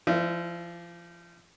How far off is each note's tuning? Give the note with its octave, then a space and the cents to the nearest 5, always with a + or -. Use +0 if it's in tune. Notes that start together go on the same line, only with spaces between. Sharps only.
F3 -30 E4 +0 D5 +0